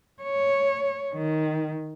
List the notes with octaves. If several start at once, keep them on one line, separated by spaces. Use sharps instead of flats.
C#5
D#3